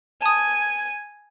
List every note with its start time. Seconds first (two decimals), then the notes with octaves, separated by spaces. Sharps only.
0.22 G#5 A5 D#6